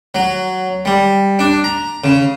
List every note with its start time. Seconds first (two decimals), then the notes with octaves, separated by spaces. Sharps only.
0.15 F#3
0.85 G3
1.39 D4
1.64 A#5
2.04 C#3